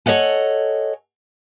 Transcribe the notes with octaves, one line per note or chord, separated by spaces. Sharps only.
A4 C#5 D#5 F#5 G#5